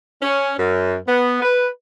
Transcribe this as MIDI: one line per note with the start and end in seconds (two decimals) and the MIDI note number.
0.22 0.53 61
0.58 0.95 42
1.08 1.40 59
1.42 1.67 71